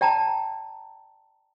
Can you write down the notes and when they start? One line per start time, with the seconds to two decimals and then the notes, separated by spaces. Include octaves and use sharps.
0.01 D5 G5 A5 A#5